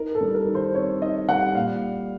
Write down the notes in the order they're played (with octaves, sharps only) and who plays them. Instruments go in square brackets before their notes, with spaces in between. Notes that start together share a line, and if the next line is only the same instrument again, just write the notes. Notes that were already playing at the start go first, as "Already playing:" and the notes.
Already playing: [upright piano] D#4 A#4
A4
G3
A#4
D#3
C5
C4 C#5
D#4 D#5
G3 F#5
A#2 F5